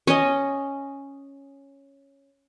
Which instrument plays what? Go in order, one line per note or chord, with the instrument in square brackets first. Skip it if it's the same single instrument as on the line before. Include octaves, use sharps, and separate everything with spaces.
[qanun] C#4 D#5